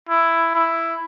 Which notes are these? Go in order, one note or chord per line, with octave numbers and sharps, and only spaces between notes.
E4
E4